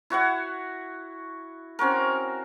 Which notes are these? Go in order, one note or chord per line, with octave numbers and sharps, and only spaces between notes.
E4 F#4 C#5 F#5
C4 C#4 F#4 A#4